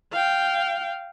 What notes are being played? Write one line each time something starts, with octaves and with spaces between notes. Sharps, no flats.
F5 G5